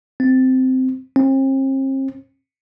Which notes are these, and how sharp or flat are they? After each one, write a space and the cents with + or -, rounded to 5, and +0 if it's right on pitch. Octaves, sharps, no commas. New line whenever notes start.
C4 -15
C4 +40